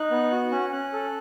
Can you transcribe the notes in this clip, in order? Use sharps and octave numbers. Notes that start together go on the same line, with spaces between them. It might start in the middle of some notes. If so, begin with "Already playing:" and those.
Already playing: D#4 F#6
B3
F#4
C#4
C#4 F#6
A4